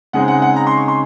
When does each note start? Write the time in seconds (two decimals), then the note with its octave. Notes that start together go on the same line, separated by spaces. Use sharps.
0.13 C#3 G#3 C4 D#4 F#5
0.28 F#5
0.42 F#5
0.56 A#5
0.67 C6
0.77 C#6
0.88 C6